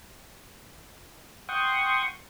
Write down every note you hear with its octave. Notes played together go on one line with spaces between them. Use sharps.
F#5 G5 C6 C#6 D#6